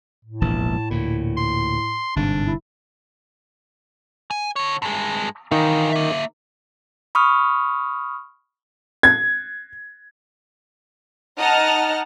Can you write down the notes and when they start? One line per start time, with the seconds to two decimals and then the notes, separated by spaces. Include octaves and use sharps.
0.25 A2
0.41 E1 A#1 E3 A5
0.91 D2 A#2 E4
1.37 C6
2.16 G1 G#2 C3 D4
2.47 E4
4.31 G#5
4.56 D3 C#5
4.82 G2 G#3
5.51 D#3 E3 D#4 F5
5.91 A#3 E5
7.15 B5 C#6 D#6 F6
9.03 G#6
11.37 D#4 D#5 F#5 A5 F6